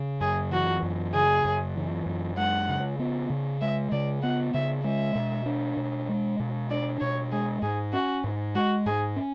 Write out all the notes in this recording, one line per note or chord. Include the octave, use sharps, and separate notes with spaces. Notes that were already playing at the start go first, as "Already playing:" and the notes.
Already playing: C#3
F#2 G#4
E3 F#4
F#2
C#3 G#4
F#2
E3
F#2
G#3 F#5
C#3
B3
C#3
G#3 E5
C#3 D5
B3 F#5
C#3 E5
G#3 E5
B2
D4
B2
G#3
B2
D4 D5
B2 C#5
G#3 G#4
G#2 G#4
C#4 F#4
G#2
G#3 F#4
G#2 G#4
C#4